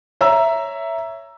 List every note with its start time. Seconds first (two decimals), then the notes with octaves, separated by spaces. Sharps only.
0.21 C#5 E5 A#5 E6